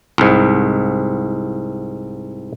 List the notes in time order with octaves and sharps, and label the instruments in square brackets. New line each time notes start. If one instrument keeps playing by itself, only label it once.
[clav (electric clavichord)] C2 G#2